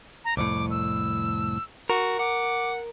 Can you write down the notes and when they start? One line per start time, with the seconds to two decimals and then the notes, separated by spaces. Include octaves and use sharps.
0.25 A#5
0.37 C2 F2 A2 D6
0.71 E6
1.90 F#4 A#4
2.19 F#5 D6